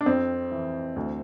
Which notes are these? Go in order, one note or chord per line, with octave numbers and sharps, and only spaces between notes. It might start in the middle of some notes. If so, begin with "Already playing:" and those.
D4
F2 C4
E3
D2